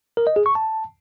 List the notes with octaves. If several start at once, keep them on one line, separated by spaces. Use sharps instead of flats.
A#4
D#5
G#4
C#6
A5